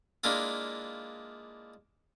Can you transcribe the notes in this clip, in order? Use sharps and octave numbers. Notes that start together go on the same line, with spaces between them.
G#3 A#3 D4 E4 F4